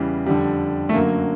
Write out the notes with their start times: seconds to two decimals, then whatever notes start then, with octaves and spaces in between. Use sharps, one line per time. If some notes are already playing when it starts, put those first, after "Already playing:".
Already playing: E2 C#3 E3 G3
0.26 F2 D3 G3
0.89 A3
0.94 F#2 D3 F#3 A#3